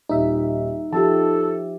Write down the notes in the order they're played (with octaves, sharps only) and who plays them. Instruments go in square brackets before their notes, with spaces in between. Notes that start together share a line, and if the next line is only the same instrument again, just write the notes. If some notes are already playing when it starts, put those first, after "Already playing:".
[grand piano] D#1 [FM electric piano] D#4 E5
[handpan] F3 F4 G4 [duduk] A4 [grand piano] A5